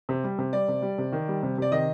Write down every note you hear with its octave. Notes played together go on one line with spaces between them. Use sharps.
C3
G3
C3
G3 D5
C3
G3
C3
D#3
G3
C3
C3 D5
D#3 D#5